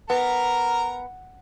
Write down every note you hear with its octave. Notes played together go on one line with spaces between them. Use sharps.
B3 A#4 A#5